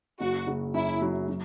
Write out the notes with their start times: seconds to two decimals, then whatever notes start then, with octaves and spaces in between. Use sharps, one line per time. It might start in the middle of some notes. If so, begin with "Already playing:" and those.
0.20 F#1 F#4
0.47 F#1
0.74 F#2 E4
1.02 F#3
1.28 F#3